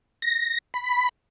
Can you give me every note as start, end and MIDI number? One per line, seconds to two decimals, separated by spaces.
0.22 0.58 94
0.74 1.09 83